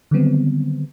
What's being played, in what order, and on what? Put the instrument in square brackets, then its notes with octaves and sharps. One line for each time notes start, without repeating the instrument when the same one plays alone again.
[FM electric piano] D3 D#3 F#3 G3 B3 C4